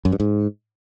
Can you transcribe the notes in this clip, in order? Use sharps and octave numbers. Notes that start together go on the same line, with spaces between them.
F#2
G2
G#2